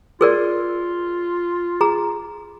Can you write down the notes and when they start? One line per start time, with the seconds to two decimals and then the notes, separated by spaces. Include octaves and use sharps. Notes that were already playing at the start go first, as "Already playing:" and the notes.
0.21 F4 G#4 A#4 D5
1.81 G#4 A#5